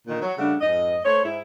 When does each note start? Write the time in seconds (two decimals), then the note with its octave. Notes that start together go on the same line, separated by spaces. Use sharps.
0.07 A#2 D3 D#3
0.22 F#3
0.38 C#3 G3 A3 D4 F#5
0.61 F2 G#2 D#5
1.04 A3 C5 C#5
1.23 G#2 E4